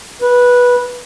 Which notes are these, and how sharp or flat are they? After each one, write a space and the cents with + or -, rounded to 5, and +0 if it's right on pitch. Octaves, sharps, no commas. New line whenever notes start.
B4 -10